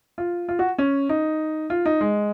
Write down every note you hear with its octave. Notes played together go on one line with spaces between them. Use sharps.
F4
F4
F#4
C#4
D#4
F4
D#4
G#3